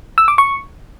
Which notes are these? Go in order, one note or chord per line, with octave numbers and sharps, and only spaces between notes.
E6
D6
C#6